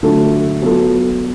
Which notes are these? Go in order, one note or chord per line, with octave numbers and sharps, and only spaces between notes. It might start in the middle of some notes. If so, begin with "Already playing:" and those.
D3 F#3 A3 F4 A4
F#3 B3 F4 A4